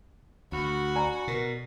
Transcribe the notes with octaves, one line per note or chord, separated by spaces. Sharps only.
D2 F#4 B5
D5 G#5 A#5
B2 A#4